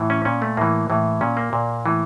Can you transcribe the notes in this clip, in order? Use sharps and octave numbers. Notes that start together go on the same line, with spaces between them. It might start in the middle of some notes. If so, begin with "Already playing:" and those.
Already playing: A2 E3
C#4
A#2 C#4
A3
A2 E3 A#3
A2 E3
A#2 C#4
A#3
A#2
A2 E3